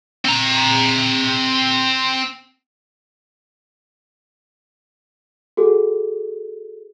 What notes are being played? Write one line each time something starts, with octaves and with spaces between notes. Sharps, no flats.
C4 A#5
F#4 G#4 A4